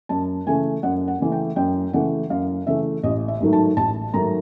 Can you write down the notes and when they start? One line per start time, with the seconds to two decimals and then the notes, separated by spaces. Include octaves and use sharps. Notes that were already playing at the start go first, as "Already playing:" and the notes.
0.09 F#2 A5
0.47 C#3 E3 A3 G#5
0.83 F#2 F#5
1.08 F#5
1.20 C#3 E3 A3
1.32 G5
1.56 F#2 G5
1.93 C#3 E3 A3 F#5
2.30 F#2 F5
2.67 C#3 E3 A3 E5
3.03 A1 D#5
3.28 E5
3.40 G#2 D#3 F#3 A3
3.53 A5
3.77 A1 A5
4.13 G#2 D#3 F#3 A3 A#5